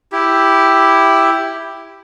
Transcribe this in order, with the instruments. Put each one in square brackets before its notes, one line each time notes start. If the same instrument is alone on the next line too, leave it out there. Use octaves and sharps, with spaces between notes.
[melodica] E4 G4